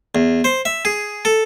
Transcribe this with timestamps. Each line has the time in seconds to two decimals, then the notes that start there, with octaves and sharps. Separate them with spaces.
0.15 E2
0.44 C5
0.65 E5
0.85 G#4
1.25 A4